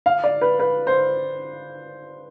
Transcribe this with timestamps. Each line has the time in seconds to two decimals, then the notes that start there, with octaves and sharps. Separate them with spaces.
0.06 F5
0.24 D5
0.41 B4
0.59 B4
0.87 C5